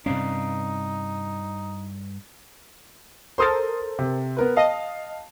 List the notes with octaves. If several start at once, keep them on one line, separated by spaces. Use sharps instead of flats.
G2 C3 C4 C#4 D#4 D5 F5
A4 A#4 C5 C6 D#6 A6
C3
B3 A#4 B4
D#5 F5 A5